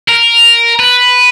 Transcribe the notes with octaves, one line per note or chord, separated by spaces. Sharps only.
A#4
B4